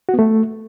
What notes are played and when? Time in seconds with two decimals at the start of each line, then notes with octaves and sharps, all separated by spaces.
0.09 F#4
0.14 B3
0.19 A3